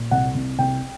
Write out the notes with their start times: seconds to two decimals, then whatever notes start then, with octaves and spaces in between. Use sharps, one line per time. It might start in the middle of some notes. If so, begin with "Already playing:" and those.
Already playing: A#2
0.11 C2 F#5
0.35 C2
0.58 C2 G5